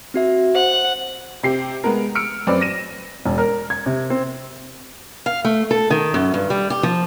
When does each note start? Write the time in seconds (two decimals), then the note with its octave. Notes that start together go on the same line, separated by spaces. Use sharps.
0.14 C4 F#4 E5
0.55 C5 F#5
1.43 C3 G4 C7
1.84 G#3 B3 A#4
2.15 E6 F6 C#7 D7
2.47 F#2 C4 B4 D5
2.61 A#6 D#7 E7
3.25 E1
3.38 A#4
3.70 G#6
3.86 C3
4.10 C4
5.26 F5
5.45 A3
5.71 A4
5.90 D#3
6.14 F#2
6.34 G2
6.50 G3
6.70 G4
6.83 F3